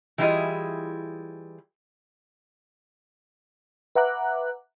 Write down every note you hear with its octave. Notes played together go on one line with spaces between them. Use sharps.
E3 G3 E4 F4 G#4 D#5
B4 E5 F#5 A#5 D6 F#6